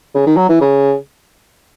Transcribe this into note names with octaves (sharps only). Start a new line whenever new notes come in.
C#3
D#3
F#3
E3
C#3